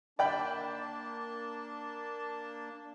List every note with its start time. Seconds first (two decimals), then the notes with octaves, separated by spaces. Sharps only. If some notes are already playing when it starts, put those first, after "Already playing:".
0.19 A#3 D4 D5 G5 A5 B5